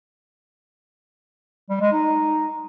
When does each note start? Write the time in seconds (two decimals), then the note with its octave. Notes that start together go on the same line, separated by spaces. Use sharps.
1.70 G3
1.81 G#3
1.93 D#4